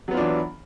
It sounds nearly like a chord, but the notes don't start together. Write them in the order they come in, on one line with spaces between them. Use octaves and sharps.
F#3 B3 F4 D4 E3